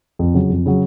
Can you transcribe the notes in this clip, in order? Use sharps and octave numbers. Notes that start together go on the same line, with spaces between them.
F2
C#3 F#3
F2
C#3 F#3